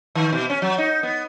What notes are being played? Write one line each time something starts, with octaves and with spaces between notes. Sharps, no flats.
D#3
B2
C#4
F#3
D#4
B3